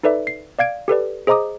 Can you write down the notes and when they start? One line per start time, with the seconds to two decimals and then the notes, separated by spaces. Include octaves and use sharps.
0.03 D#4 A4 B4 D5 E5
0.27 C7
0.59 D5 F5 G#6 D7
0.88 G4 A4 B4 D5
1.27 G#4 C5 D#5 A#5 D6 D#6